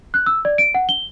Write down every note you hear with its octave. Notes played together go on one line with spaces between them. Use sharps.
F#6
E6
D5
D7
F#5
G7